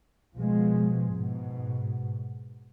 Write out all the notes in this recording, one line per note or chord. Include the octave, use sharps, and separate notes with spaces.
B2 F3 G#3
G#2 B2